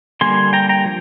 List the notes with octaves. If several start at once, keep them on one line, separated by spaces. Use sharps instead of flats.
D3 G3 A#3 G#5 C6
G5 A#5
G5 A#5
F3